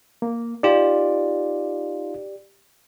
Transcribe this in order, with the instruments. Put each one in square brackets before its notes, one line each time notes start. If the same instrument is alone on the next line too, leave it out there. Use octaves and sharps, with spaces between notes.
[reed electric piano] A#3
[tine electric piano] D#4 F4 [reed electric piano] G4 D5